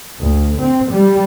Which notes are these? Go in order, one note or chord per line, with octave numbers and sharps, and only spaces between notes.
D2
C4
G3